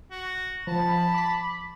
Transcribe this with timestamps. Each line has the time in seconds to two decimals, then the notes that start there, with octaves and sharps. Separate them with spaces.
0.11 F#4
0.67 F3 A5 B5
1.14 D6 B6